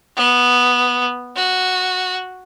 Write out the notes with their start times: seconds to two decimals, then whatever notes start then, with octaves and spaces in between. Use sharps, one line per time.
0.17 B3
1.36 F#4